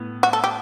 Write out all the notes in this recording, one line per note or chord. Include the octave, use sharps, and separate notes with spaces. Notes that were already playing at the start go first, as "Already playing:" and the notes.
Already playing: A2 B3
F#4
A4
G4